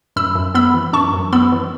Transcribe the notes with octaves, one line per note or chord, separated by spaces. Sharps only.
F#2 B5 E6
F#2
B3 B5 E6
E3
F#2 A5 C#6
F#2
B3 B5 E6
E3